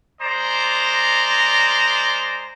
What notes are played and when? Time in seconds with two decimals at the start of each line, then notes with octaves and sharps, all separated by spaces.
0.22 G#3 C5 D5 A#5